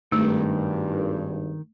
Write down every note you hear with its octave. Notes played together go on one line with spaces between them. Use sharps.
G#1 G2 D#3 A3